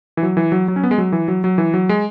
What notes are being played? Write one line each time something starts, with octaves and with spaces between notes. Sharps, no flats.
E3
F#3
E3
F#3
F#3
C#4
B3
G#3
F#3
E3
F#3
F#3
E3
F#3
G#3